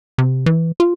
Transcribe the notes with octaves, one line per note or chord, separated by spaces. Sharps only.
C3
E3
F4